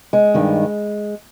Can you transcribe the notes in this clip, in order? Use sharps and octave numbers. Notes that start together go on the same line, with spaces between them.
G#3
G2 D#3